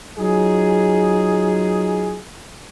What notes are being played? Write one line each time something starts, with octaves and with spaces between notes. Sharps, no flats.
F#3 D#4 F4 G#4